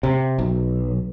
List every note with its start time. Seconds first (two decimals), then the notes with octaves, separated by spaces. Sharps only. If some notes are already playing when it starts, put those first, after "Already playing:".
0.03 C3
0.38 B1